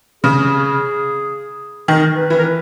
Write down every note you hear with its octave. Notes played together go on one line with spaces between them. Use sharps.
C#3 G#4
D#3 A#4
B4
E3
A#4
B4